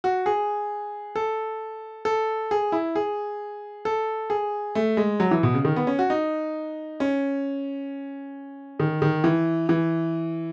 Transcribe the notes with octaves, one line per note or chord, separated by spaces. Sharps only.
F#4
G#4
A4
A4
G#4
E4
G#4
A4
G#4
A3
G#3
F#3
E3
B2
C#3
D#3
B3
C#4
F#4
D#4
C#4
D#3
D#3
E3
E3